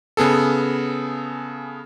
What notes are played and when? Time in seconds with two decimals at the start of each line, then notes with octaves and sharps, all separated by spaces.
0.17 C#3 B3 G#4 A4